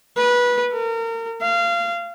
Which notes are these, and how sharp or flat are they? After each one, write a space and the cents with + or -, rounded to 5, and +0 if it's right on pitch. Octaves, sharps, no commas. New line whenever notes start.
B4 -20
A#4 -35
F5 -25